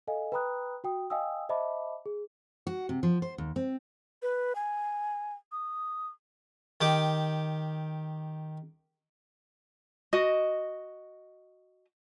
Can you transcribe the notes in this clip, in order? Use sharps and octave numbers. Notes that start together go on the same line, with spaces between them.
A4 D#5 F5 G#5
B4 G5 A#5 B5 D#6 F#6
F#4 G5 D#6
D#5 F5 G5 G#5 D#6 E6
C5 D#5 E5 A5 B5 D6
G#4
F#4
C3
F3
C5
D#2
C4
B4
G#5
D#6
D#3 G4 D6
F#4 D#5